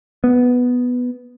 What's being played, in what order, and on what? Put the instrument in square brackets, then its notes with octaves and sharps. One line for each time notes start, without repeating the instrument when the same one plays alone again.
[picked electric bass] B3